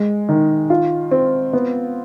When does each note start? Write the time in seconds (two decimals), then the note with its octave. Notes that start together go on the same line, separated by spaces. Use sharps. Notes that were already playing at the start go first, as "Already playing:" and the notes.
Already playing: G#3
0.29 D#3
0.70 F4
1.11 C4
1.53 B3